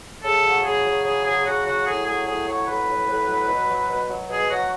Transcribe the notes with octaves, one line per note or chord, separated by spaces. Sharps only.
C#3 A4
F#3
C#3 G#4
F#3
C#3 G#4
F#3 G#4
C#3 F#4
F#3 F#4
A2 G#4
F#3 G#4
A2 G#4
F#3 C#5
A2 B4
F#3
A2
F#3
B2
F#3
B2
F#3
B2 G#4
F#3 F#4